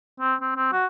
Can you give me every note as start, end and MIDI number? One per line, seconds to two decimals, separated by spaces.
0.20 0.35 60
0.41 0.53 60
0.56 0.72 60
0.72 0.86 66